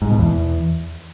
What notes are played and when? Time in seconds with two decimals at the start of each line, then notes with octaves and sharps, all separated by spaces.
0.02 G#2
0.10 B2
0.19 E2